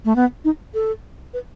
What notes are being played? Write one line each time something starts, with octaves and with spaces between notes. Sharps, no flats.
A3
B3
D#4
A4
B4